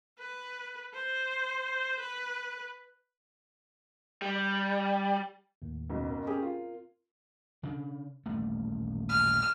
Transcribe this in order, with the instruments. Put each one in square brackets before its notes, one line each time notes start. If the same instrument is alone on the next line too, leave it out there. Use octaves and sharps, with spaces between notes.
[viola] B4
C5
B4
[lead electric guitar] G3
[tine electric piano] D#2 A2
[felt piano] F#1 B1
[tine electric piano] C4 A#4
[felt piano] C#4 G4 G#4
F4
[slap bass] C#3 D4
D#1 A1 A3
[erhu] F6